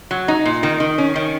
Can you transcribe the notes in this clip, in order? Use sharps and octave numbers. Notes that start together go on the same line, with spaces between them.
F#3
D#4
A#2
D#3
D#3
C#4
D#3